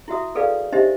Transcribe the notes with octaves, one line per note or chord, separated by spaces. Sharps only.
E4 F#4 E5 D#6
G#4 A4 B4 D5 F5
D4 D#4 G4 C5 D#5 E5